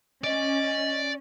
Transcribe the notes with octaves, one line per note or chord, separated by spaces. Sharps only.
C#4 D5 D#5